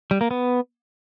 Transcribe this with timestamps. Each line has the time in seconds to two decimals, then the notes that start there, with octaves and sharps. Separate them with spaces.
0.11 G3
0.21 A#3
0.31 B3